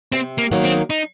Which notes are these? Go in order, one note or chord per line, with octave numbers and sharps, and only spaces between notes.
C3 C4
A#3
D#3 F#3 A#3 D#4
C4
D#4